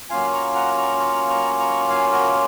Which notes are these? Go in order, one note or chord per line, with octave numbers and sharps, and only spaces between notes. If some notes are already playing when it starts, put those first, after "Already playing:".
F#3 A#3 C#4 F4 F5 G#5
A#5 C#6
F#5 A#5
A#5 C#6
A#5 C#6
A#5 C#6
A#5 C#6
F5 G#5
F#4 A#4